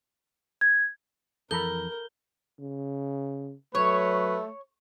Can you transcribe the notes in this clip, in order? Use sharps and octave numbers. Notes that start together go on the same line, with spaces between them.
G#6
F2 E3 A4 A#4 A#5 B5 G6 G7
C#3
F#3 A3 B4 C#5